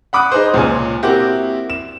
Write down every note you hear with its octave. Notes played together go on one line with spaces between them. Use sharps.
F#5 B5 D6 D#6 F#6
D#4 G#4 B4 C5
C#2 A#2 C#4 G#5
A#3 C4 E4 F#4 G4
E7